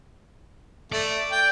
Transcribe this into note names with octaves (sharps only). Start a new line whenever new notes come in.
A3 D5
G5